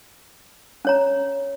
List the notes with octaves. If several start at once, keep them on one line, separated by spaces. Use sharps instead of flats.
C#4 C#5 A#5